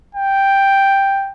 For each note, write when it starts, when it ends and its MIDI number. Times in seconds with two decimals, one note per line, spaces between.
0.15 1.33 79